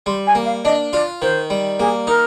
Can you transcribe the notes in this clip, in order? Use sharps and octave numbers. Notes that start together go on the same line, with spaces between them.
G3 C6
G#5
A#3
F5
D4 D#5
F4 D5
D#3 C5
G3
A#3 G#4
D#4 A#4